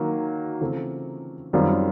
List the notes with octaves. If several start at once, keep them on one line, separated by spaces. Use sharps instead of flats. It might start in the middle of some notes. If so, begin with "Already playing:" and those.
Already playing: D#3 F#3 A#3
C#3 E3 A3 C4 F4
F#2 D#3 G3 C4 F4